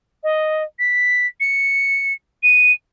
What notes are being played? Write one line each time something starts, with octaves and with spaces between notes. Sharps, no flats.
D#5
B6
C#7
D#7